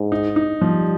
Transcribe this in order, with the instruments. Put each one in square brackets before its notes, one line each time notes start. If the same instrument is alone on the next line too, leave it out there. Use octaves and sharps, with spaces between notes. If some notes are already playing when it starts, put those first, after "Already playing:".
Already playing: [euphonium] G#2
[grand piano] D#4
D#4
[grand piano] F3 [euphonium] G3